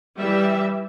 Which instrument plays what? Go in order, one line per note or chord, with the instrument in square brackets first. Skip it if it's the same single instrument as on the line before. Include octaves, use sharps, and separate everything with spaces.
[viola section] E3 G3 G4 E5